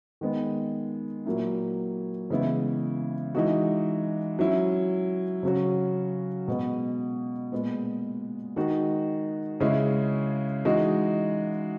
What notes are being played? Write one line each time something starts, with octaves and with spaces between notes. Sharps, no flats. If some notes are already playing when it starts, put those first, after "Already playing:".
D#3 G#3 B3
A#2 F#3 A#3 E4
C#3 E3 G#3 B3 E4
E3 G#3 D#4 F#4
F#3 C#4 E4
C#3 F#3 C#4 F#4
B2 G#3 B3
A#2 G#3 B3
D#3 G#3 D#4 F#4
C#3 G#3 C#4 E4
E3 G#3 D#4 F#4